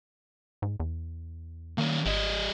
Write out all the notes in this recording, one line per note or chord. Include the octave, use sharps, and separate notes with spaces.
G#2
E2
D#3 A#3 C#4
G#1 G3 D#5